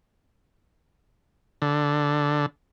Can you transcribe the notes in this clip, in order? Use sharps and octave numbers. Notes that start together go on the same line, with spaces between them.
D3